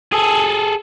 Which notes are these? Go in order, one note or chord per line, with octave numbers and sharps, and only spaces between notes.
G#4 A4